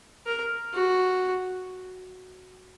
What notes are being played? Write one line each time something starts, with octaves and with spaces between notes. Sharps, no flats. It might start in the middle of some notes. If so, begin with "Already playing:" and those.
A#4
F#4